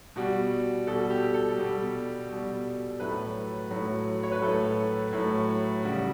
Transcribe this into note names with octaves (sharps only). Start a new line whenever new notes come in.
B2 G3 F#4
B2 G3 A4
G4
A4
B2 G3
B2 G3
A2 F#3 A3 B4
A2 F#3 A3
C#5
B4
A2 F#3 A3 A4
A2 F#3 A3
C#3 G3 F#4